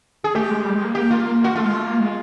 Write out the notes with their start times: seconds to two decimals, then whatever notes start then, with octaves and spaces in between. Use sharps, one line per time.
0.24 G#4
0.35 A3 G4
0.50 G#3
0.65 G3
0.75 G#3
0.84 A#3
0.95 G4
1.11 F4
1.44 F#4
1.55 A3 F4
1.65 G#3
1.75 A3
1.86 A#3
2.00 G#3